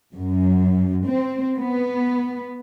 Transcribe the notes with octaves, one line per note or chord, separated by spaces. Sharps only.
F#2
C4
B3